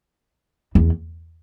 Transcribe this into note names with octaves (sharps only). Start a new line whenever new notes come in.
E2